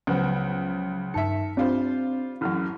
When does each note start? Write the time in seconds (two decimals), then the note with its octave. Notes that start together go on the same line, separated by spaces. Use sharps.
0.07 C#2 F3 F#3 B3 C5
1.14 G2 D#3 E5 A5 C#7
1.57 G3 C4 D4 F4 C5
2.41 A1 F#2 E4 F6